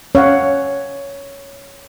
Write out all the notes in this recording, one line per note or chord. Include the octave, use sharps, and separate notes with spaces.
C#4 C#5 F5 F#5